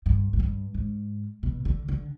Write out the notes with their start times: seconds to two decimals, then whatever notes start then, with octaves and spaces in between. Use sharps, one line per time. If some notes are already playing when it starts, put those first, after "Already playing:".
0.06 G2
0.33 G#2
0.40 G2
0.74 G#2
1.43 B2
1.65 D3
1.88 D3